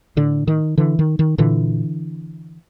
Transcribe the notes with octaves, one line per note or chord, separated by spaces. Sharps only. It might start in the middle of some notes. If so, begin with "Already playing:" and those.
A2 D3
D#3
D3 E3
D#3
D#3
A#2 D3 E3